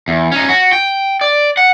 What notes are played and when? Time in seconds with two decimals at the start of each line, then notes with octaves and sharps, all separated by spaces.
0.08 E2
0.32 C#4 D#4
0.49 F#4
0.73 G5
1.21 D5
1.57 F#5